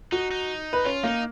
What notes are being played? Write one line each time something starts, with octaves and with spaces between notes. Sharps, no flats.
D#4 F#4
D#4
B4
C#4 F4
A#3 D#4